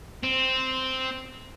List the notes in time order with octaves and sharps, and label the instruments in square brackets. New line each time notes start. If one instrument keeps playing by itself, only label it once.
[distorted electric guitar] C4